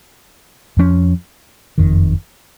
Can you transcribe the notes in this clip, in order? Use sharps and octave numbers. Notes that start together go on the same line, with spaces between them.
F2 F3 A#3 C#4
F#1 F2 D#3